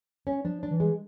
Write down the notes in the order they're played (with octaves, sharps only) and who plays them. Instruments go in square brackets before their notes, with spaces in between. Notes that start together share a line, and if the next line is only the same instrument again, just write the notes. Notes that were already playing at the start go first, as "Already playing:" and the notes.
[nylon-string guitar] C#4
[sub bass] F3 [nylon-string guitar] D4
[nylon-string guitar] D4
[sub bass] E3
[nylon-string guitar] G#3